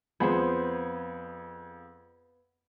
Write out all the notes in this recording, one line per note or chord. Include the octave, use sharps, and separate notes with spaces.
F2 B3 G#4 C5